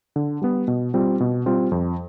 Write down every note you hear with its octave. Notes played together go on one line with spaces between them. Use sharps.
D3
G3 B3
B2
G3 C4 F4
B2
G3 C4 F4
F2